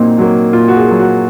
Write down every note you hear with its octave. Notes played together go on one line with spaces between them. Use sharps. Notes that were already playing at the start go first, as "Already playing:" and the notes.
Already playing: A#2 F#3 A#3 C4 D#4
F#3 A#3
A#2 F4
F#4
G#4
F#3 A#3
F#4